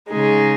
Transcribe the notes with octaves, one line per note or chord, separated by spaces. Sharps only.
C#3 G#3 D#4 G#4